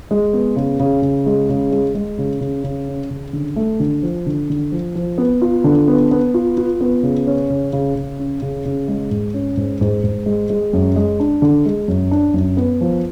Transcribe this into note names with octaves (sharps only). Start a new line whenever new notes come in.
G#3
B3
C#3
C#3
C#3
G#3
C#3
G#3
G#3
C#3
C#3
C#3
C#4
C#3
D3
A3
D3
F3
D3
D3
F3
F3
B3
F4
D3
B3
B3
F4
F4
B3
C#3
C#4
C#3
C#3
C#3
C#4
C#3
C#3
G#3
G#2
C#4
G#2
G#2
G#2
G#3
G#3
F#2
G#3
D4
D3
G#3
F#2
D4
F#2
B3
F3